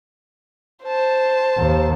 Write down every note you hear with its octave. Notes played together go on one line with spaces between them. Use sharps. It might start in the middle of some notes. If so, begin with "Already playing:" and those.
C5 A5
D#2